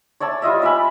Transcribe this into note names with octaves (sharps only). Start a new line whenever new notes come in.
C#5 D5 E5 A5
G3 F4 D#5 E5
D5 E5 G#5 B5